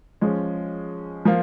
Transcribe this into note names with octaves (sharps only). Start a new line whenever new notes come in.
F3 G#3 C#4
F3 A#3 F4